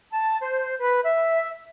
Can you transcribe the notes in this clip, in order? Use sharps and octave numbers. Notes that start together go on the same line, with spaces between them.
A5
C5
B4
E5